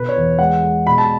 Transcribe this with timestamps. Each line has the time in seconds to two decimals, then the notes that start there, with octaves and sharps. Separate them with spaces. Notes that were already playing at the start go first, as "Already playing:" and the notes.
Already playing: B2 B4
0.09 C#5
0.16 E2
0.39 G#3 F#5
0.63 G#3
0.86 B2 B5
0.98 A5